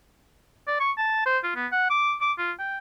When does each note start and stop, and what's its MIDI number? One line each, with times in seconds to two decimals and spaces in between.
0.68 0.78 74
0.80 0.91 85
0.98 1.26 81
1.26 1.38 72
1.44 1.51 65
1.56 1.67 59
1.72 1.89 78
1.90 2.15 86
2.21 2.33 86
2.38 2.52 65
2.59 2.78 79